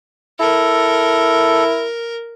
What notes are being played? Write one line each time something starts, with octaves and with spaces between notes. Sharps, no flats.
E4 A4 A#4